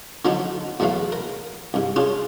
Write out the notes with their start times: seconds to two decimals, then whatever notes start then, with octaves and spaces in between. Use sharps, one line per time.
0.25 D3 F3 F#3 C4 D4 D#4
0.80 E2 F#3 A3 B3 F5
1.12 A#4
1.74 C2 G2
1.96 C#4 D4 F4 G#4